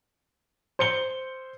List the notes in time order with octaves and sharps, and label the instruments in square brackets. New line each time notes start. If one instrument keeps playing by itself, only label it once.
[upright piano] C5 C#7 G7